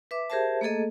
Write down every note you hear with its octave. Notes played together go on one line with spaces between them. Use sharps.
B4 E5 D6
G4 G#4 A#4 C5 E5 A5
A3 A#3 G#4 A4 D#5